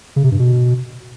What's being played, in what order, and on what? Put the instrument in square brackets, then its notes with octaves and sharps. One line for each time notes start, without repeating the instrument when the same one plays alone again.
[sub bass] C#3
C3
G2
B2